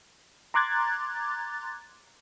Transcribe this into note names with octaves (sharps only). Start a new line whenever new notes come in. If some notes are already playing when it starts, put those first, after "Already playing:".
A#5 C6 D6 F#6 G#6 A6